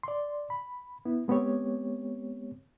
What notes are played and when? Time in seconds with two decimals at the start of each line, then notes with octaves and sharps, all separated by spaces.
0.03 D5 C6
0.50 B5
1.05 B3 E4
1.28 G#3 B3 C4 G4 C#5